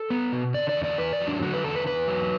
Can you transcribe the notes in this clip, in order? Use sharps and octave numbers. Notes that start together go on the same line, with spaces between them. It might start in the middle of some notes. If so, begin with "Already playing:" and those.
Already playing: A4
B3
B2
D3 D5
D5
E2
D5
E2 B4
D5
F#3
D4
D3 F#4
B4
E2 A4
B4
E2 B4
F#3